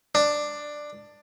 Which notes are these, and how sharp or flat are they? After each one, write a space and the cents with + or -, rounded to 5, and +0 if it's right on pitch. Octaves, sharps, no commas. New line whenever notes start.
D4 +10